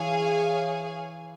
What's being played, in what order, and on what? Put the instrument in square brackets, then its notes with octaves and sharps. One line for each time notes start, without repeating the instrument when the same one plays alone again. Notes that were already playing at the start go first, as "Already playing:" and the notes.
Already playing: [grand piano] E3 E4 [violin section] G#4 C#5 F5 G#5